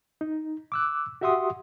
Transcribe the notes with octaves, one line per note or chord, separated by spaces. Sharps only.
D#4
D6 E6 F#6
F#4 G4 E5 F#5 C6 D#6